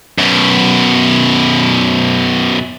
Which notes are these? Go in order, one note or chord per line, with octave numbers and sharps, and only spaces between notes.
F#2 B2